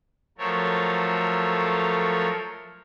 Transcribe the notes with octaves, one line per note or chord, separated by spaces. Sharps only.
F3 F#3 A3 A4 A#4 C#5